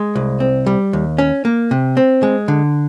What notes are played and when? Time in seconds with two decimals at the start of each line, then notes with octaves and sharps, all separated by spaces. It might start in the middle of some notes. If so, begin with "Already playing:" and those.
Already playing: G#3
0.15 C2
0.40 C4
0.67 G3
0.93 D#2
1.18 C#4
1.45 A#3
1.71 C3
1.97 C4
2.23 G#3
2.48 D3